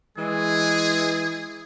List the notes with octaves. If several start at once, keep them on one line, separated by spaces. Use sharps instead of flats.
E3 G#3 G#4